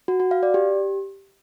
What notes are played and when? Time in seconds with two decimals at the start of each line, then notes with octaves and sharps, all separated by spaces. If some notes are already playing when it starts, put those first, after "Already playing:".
0.08 F#4
0.20 F#4
0.31 F5
0.43 D5
0.54 G4